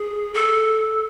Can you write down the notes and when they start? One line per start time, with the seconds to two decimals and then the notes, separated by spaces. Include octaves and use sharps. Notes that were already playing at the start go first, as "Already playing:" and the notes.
Already playing: G#4
0.34 A4